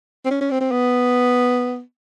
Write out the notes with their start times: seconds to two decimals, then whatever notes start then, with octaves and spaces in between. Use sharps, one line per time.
0.25 C4
0.31 C#4
0.41 C#4
0.51 C4
0.61 C4
0.71 B3